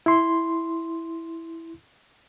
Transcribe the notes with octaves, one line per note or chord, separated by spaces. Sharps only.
E4 C6